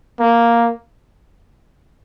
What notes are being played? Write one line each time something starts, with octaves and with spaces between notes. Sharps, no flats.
A#3